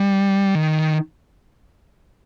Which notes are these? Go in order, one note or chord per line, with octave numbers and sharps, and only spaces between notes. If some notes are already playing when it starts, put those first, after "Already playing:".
Already playing: G3
D#3